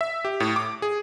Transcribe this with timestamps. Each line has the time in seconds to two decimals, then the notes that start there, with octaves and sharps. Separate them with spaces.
0.01 E5
0.25 G4
0.40 A2
0.56 D6
0.82 G#4